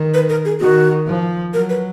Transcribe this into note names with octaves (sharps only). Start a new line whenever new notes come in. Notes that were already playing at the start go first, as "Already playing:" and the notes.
Already playing: D#3
B4
A#4
G#4
D#3 F#4
F3
F#3 A#4
B4